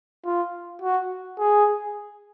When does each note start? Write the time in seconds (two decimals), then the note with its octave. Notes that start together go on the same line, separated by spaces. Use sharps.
0.25 F4
0.82 F#4
1.39 G#4